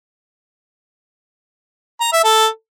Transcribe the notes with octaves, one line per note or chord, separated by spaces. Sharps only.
A#5
E5
A4